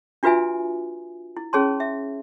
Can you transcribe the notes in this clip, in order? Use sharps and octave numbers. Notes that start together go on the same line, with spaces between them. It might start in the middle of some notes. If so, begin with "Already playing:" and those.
D4 F4 F#4 B4 E5 G#5
E4
C#4 G#4 C#5 A5 C6
E5